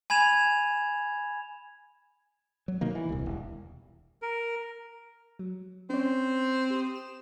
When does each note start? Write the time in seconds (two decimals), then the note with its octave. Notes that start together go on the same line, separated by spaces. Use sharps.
0.10 G#5 B5 G#6 E7 F7
2.68 F#3
2.81 B2 D#3 A#3
2.95 E3
3.09 D1 C2
3.26 E1
4.22 A#4
5.39 F#3
5.90 C4 C#4 C#5
6.70 G4 D#6
6.96 E7